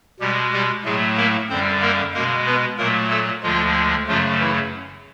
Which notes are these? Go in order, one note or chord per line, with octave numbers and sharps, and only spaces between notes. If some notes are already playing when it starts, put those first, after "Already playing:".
B2 G3 G#3 G4
G3 G4
A2 F#3 G#3 A3 G#4
A#3 A#4
F#2 D3 G3 C4 C5
A#3 A#4
B2 G#3 A#3 A#4
B3 B4
A#2 F#3 A3 A#3 A#4
A3 A4
D2 D3 F3 G#3 F4
F#2 C#3 F3 F#3 A3 F4
E3 E4